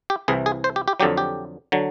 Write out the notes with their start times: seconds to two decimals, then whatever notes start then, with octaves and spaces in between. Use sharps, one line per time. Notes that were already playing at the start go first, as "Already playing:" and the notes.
0.10 G4
0.28 C2 C3 E3 G#4
0.46 G#4
0.64 C5
0.76 G4
0.88 G4
1.00 F2 D3 F#3 G4
1.17 G4
1.72 D3 F#3